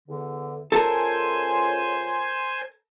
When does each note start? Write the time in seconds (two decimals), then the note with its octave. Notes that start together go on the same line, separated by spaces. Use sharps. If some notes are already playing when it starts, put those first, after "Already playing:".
0.08 E2 D3
0.72 C#2 C#4 F4 A4 A#4 C5 G#5